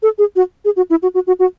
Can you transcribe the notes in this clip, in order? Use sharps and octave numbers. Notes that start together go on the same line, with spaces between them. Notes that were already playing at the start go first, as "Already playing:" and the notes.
A4
G#4
F#4
G#4
F#4
E4
F#4
F#4
F#4
F#4